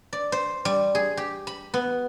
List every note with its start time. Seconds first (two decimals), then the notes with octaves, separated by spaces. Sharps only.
0.13 D5
0.32 C5
0.65 G3
0.95 G#4
1.17 G4
1.47 B5
1.74 B3